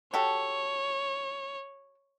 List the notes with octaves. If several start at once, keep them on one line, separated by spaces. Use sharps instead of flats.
F#4 G4 A4 C#5